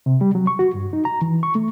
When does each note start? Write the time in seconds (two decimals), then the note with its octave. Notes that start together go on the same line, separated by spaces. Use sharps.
0.06 C3
0.21 G3
0.35 F#3
0.47 C#6
0.59 F#4
0.74 G2
0.93 D#4
1.05 A#5
1.22 E3
1.43 C#6
1.55 A3